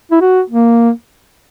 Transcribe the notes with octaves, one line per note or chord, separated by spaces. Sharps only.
E4
F#4
A#3